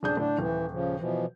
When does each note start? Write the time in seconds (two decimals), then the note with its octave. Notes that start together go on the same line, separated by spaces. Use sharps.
0.03 D#1 D4 G#4 G6
0.17 A2 D3 D4
0.39 D#1 E3
0.71 C#3 F3
0.97 B2 E3 F3